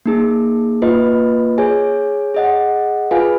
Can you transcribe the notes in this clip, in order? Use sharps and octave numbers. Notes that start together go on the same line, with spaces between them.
A#3 D#4 G#4
A#3 F4 B4 D#5
G#4 C#5 G#5
G#4 D#5 F#5
F4 G#4 B4 F5 G#5